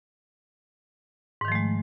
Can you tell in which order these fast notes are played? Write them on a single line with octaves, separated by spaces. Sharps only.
G#2 D#3 F3 A3 G#3